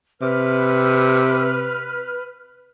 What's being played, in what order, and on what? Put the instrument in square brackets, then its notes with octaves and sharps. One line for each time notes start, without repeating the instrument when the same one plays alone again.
[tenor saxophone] C3 [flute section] B4 F6